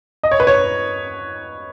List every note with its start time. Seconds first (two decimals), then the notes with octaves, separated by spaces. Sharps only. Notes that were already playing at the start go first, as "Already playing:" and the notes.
0.23 D#5
0.31 C#5
0.40 B4
0.47 C#5